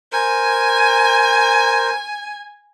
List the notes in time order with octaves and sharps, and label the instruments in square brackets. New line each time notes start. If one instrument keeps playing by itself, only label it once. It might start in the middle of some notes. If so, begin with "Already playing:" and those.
[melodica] A#4 C5 [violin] G#5